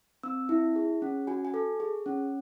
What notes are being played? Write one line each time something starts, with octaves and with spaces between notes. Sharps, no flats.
C4 E6
E4
G#4
C#4
F#4 G#5
G#5
A4
G#4
C#4